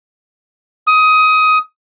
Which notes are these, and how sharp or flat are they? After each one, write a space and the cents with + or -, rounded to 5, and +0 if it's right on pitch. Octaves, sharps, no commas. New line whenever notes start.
D#6 +20